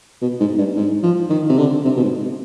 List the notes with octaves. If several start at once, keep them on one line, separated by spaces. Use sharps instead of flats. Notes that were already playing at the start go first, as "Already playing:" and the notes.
B2
G#2
G2
G#2
F3
D#3
C3
D3
C3
B2
G#2